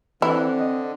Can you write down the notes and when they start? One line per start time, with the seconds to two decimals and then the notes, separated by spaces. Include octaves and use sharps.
0.22 D3 E3 C4 E4
0.59 D#5